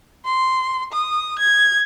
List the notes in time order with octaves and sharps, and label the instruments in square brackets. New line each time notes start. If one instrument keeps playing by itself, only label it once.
[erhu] C6
D#6
G#6